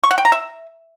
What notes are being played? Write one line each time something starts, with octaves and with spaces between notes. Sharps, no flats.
C#6
F#5
G5
A#5
E5